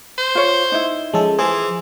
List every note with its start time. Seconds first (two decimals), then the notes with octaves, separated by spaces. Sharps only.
0.18 C5
0.35 F4 C#5
0.72 D#4 E4
1.14 F3 G#3 C#4 A4
1.39 E3 G#4 C5